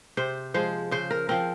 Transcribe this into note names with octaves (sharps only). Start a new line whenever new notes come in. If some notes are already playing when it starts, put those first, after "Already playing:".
C3 C5
F3 G#3 C5
C#3 C5
A#4
F3 C4 A#4